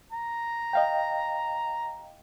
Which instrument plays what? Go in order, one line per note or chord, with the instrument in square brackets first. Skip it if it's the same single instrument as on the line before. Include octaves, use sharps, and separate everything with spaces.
[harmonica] A#5
[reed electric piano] D#5 F5 G5